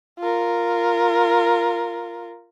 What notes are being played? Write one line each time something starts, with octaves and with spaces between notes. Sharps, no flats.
F4 A#4